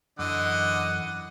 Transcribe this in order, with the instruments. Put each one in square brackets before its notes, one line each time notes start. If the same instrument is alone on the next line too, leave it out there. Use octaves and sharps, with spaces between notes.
[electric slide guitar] F#2 E3 [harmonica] D3 D#5 [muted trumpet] F#5